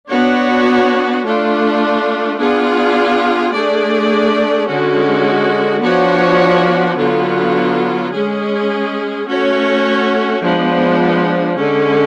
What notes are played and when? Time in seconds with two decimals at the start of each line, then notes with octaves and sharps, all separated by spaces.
0.11 B3 D4 F#4 C#5
1.25 A3 D4 F4
2.41 B3 D4 F4 G#4
3.55 A3 D4 G#4 D5
4.69 D3 G#3 C#4 F#4
5.84 F3 B3 D4 F#4 C#5
6.99 D3 F#3 B3 F4
8.13 G#3 C#4 G#4
9.29 A3 C#4 F#4 C#5
10.43 F3 G#3 B3 D4
11.58 D3 G#3 C#4